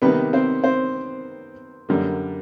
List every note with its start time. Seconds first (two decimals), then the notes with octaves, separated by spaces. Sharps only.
0.02 C3 D#3 G3 A#3 B3 B4
0.33 C4 C5
0.64 C4 C5
1.89 F#2 D3 G3 A#3